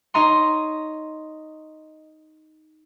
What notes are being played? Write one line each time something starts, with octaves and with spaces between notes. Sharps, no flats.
D#4 C#5 D#5 A#5 C6